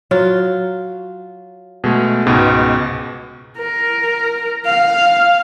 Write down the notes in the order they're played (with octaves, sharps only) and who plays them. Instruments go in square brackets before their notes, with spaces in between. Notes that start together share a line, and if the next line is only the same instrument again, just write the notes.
[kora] F#3 F4
[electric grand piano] B2 G#3 A3
C#2 G#2 B2
[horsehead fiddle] A#4
F5